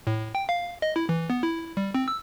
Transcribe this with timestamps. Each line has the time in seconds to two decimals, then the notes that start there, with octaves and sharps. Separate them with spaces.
0.07 A2
0.35 G5
0.49 F5
0.82 D#5
0.96 E4
1.09 E3
1.30 B3
1.43 E4
1.77 G3
1.95 C4
2.08 E6